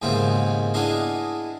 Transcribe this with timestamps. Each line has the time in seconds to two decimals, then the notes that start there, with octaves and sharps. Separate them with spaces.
0.02 D#2 G#2 C#3 B3 C4 E4
0.74 B3 D4 E4 G#4 D#5 F5